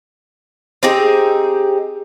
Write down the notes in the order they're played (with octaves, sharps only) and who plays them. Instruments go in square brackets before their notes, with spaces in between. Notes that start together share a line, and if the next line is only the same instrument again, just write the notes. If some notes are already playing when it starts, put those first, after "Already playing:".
[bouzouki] C4 D#4 G4 G#4